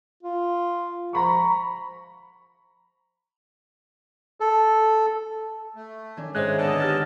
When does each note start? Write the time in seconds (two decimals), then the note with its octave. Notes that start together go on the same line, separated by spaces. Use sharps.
0.23 F4
1.13 F3 A#5 B5 C#6
4.40 A4
5.75 A3
6.17 D#3 C#4 D4
6.35 G#2 G#3 C5 E5 F#6
6.58 D3 B3 D#5 A5
6.80 G4 F6 A6